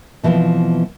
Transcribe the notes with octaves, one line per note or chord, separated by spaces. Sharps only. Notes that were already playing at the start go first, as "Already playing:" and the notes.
B2 E3 F3 G3 B3 C4